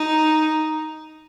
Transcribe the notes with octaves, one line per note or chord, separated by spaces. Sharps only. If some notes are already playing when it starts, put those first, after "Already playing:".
Already playing: D#4